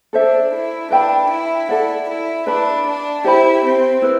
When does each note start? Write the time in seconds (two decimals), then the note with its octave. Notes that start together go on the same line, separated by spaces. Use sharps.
0.13 D4 A4 C5 E5
0.52 E4
0.90 D4 B4 E5 G5 B5
1.30 E4
1.68 E4 A4 D5 F#5
2.08 E4
2.47 D4 B4 E5 B5
2.85 D4
3.24 E4 G4 C5 G5 B5
3.63 C4
4.02 E4 B4